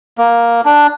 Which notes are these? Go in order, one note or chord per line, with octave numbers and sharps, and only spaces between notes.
A#3
D4